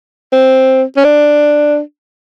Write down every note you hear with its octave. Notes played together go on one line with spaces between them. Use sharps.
C4
C#4
D4